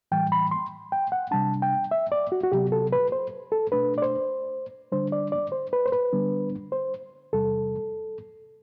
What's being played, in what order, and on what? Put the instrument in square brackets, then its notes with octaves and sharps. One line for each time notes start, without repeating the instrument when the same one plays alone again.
[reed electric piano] A2 E3 G3 G5
B5
C6
G5
F#5
C3 G3 D4 A5
G5
E5
D5
F#4
F#4
C3 F#3 B3 G4
A4
B4
C5
A4
B2 A3 D4 B4
D5
C5
D3 G3 D4 C5
D5
D5
C5
B4
C5
B4
D3 G3 B3 D4
C5
E2 C3 G3 A4